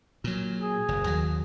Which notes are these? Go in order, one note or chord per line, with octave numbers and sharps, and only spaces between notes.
A#2 F#3
G#4
F#1
D#2 F#3